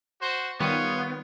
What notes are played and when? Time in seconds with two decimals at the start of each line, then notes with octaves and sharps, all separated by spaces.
0.21 F#4 C5
0.60 D#3 G3 B3 F4 C#5